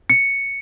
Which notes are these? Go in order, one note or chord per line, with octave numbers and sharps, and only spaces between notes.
C#7